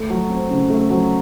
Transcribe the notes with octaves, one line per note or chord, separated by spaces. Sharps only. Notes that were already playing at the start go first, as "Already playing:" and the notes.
Already playing: A3
F#3
C4
C#3
A3
F#3